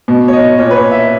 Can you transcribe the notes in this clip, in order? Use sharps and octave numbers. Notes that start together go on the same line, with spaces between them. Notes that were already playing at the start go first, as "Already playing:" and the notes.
B2
C#5
D#5
A#2 C#5
B4
C#5
E5